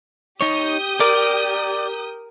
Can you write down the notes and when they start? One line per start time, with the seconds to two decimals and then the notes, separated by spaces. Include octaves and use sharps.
0.41 D#4 G4 C#5 D#6 G6
1.00 A#4 D5